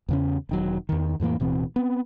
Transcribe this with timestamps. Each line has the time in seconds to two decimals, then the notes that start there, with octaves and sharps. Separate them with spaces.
0.08 E2 C#3 C#4
0.49 E1 D#3 F#3
0.89 E2 D#3
1.20 F2 A2 E3 A#3
1.40 D1 B2 E3 C4
1.76 B3 C4